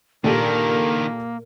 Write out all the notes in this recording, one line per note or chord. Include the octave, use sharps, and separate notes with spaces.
A#2 D#3 A#3 D4 G4 A4 A#4